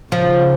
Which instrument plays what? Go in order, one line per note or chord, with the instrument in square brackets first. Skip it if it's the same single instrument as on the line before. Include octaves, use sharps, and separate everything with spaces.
[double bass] C#3 [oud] F3